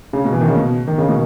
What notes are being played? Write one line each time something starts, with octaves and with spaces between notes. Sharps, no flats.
C#3
B2
E3
D#3
C#3
B2
D#3
C#3
B2 D#3